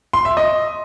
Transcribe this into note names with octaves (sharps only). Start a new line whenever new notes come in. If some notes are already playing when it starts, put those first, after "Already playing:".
C6
E5
D#5